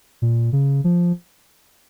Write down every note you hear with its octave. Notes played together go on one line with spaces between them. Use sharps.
A#2
C#3
F3